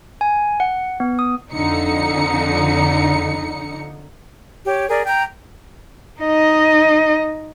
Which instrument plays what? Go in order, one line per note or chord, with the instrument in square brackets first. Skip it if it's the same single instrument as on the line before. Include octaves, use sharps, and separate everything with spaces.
[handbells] G#5
F#5
B3
D#6
[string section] F2 D3 D#4 C#7
[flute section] G4 C#5
G#4 A#4 D5
G5 A#5 G6
[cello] D#4 D#5